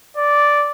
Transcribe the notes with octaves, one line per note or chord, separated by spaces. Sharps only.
D5